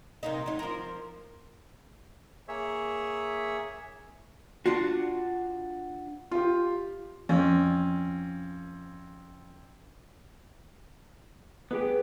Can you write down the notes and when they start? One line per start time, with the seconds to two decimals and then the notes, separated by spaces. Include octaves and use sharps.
0.23 C3 A#3 D#4
0.46 F#3 D#4
0.59 F3 A#4
2.48 A#3 G#4 C#5 E5
4.66 D4 F4 F#4
6.31 F4 G4
7.29 F2 C#4
11.71 B3 G4 G#4 B4